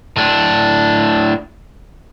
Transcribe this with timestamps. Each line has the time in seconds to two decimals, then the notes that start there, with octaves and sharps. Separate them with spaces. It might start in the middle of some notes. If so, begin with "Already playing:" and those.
0.16 A2 D4